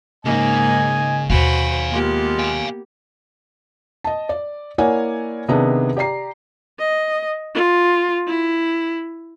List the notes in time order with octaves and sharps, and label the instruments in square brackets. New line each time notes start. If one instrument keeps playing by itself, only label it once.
[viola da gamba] G#2 A#3 D#4 [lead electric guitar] C#3 [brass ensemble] D#5 G#5
[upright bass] D#2 B2 [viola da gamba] F#4 B4 C5 [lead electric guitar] F5 G#5
[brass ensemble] G#3 F4 [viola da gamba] A#3 B3 G4
[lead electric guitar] F5 G#5
[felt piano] D#5 A5
D5
A#3 E4 C#5 D5 F#5 G#5
C3 D#3 B3 D4 D#4 G#4
G4 D5 A#5 C7
[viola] D#5
F4
E4